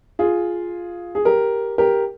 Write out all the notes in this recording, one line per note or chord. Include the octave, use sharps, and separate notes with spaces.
F4 G#4
G#4
G4 A#4
G4 A#4